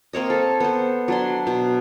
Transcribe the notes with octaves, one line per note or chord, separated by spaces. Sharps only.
A#3 C4 C#5 D#5
A4
B3 C5
F#3 D4 C6
B2